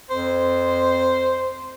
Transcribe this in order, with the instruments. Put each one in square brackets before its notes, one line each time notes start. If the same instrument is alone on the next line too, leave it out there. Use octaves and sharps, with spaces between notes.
[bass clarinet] F2 [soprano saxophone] C5